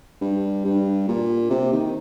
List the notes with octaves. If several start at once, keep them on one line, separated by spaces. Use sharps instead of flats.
G2
G2
A#2
C3
D#3